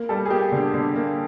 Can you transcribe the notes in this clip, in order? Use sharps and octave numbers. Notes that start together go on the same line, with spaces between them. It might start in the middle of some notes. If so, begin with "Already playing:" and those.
Already playing: A#3
G3 A4
G#4
A#3 G4
D3
D3
A#3